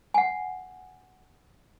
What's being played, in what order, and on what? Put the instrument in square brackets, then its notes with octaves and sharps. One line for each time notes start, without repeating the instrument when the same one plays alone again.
[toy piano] F#5 G#5